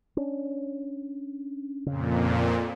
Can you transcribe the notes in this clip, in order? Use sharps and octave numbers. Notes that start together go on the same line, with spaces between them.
C#4 D4
F2 A#2 C#3